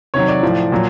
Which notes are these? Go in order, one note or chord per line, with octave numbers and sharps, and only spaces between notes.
C3 D#3 F#3 C#5
D5
A2 F3
A#2 F#3